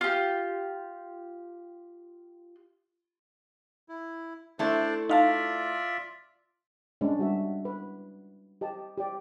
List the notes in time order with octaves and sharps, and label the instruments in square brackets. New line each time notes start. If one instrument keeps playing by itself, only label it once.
[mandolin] F4 G4
[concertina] E4
[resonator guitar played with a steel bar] A3 E4 A4 [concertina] D4 C5 D5
[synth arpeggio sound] D#4 F5 A5 [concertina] F4 D5 E5
[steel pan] G#3 C#4 D4
G3 F#4 E5
B4
G4 D#5 A5
G4 D5